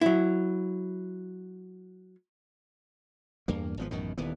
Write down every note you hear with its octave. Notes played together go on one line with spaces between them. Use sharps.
F#3 E4
E2 G2 A#3
G#1 F3 B3
A1 F#2 B2 D#3
D#1 D#2 E3 B3